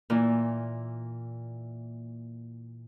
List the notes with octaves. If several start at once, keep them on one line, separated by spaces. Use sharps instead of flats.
A#2 E3 E4